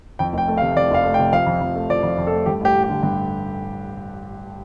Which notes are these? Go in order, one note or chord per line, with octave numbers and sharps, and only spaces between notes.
F2 G5
F1 G5
A3
F5
C3
F2 D5
F1 F5
A3
G5
C3
F3 F5
F2
F2
A3
F3 D5
F2
F2
A4
A3
G2 G4
A1 G4
A1
G4
D3
G2